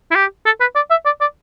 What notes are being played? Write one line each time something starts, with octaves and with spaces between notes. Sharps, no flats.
E4
G4
A4
B4
D5
E5
D5
D5